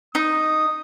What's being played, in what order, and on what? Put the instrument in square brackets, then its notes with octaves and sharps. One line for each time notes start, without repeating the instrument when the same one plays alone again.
[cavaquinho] D#4 [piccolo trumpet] D#6